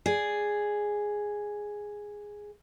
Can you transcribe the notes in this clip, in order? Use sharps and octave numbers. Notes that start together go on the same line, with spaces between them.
G#4 D5